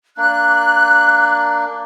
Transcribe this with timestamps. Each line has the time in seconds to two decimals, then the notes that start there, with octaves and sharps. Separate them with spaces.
0.17 A#3 D4 F#6